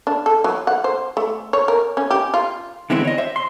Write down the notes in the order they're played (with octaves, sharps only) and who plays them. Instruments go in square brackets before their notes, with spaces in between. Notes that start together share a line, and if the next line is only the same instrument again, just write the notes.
[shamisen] D4
A4
F#3
F#5
C5
A3
C#5
A#4
C#4
G4
F4
[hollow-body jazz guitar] D3 E3 G#3 B3 C4 E4
C#5 D#5
C5 E5
C6